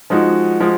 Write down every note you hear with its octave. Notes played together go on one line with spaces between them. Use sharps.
F3 G#3 D#4 F#4
F3 G#3